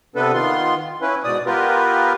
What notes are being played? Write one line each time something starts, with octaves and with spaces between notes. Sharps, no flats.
C3 B3 D4 A4 B4
D#3 B3 F4 C6
C#4 E4 B4
G#2 B2 D5 D#6
B3 F4 G4 A#4 B4